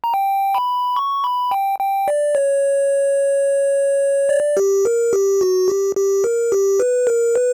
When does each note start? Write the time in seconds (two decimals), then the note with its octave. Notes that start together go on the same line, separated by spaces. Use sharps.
0.04 A#5
0.14 G5
0.55 B5
0.96 C#6
1.24 B5
1.51 G5
1.80 G5
2.08 D5
2.35 C#5
4.29 D5
4.57 G4
4.85 A#4
5.13 G4
5.41 F#4
5.68 G4
5.96 G4
6.24 A#4
6.52 G4
6.80 B4
7.07 A#4
7.35 B4